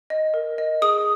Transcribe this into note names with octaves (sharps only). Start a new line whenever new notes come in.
D#5
A#4
D#5
G#4 D#6